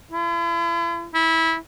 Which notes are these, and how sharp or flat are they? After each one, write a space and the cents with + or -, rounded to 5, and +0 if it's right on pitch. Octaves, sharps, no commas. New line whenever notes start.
E4 +45
E4 -20